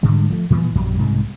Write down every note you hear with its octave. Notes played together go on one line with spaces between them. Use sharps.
G#2 D3 G3 G#3
F3 A3
A#2 E3 F3 B3
A#1 F#2 F#3 G3
C2 G#2 B2